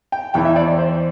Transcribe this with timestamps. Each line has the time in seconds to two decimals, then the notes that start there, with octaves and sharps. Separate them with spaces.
0.12 G5
0.34 E2 E3 G5
0.45 E5
0.56 D5
0.67 D5
0.78 C5